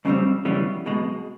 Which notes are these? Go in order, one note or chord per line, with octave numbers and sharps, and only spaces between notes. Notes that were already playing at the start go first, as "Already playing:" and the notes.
F2 C#3 E3 G3 C4
F2 C#3 E3 G3 B3
B1 B2 G#3